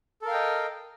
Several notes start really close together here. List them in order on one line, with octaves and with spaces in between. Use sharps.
A4 A#4 F5 G5 D#5